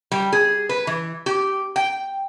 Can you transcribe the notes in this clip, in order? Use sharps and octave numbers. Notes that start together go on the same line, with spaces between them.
G3
G#4
B4
E3
G4
G5